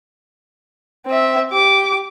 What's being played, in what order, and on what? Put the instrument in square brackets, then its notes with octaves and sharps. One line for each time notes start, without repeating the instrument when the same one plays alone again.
[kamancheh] C4 E5
G4 D6